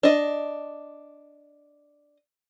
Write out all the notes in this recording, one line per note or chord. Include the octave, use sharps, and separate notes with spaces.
D4 D#5